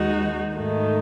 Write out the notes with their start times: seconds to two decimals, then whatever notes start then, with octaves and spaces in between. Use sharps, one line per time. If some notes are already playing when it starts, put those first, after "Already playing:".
Already playing: D#2 D#3 G#3 D#4 F#4
0.57 G#2 D#3 A3